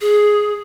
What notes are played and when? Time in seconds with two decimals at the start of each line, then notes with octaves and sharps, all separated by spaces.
0.01 G#4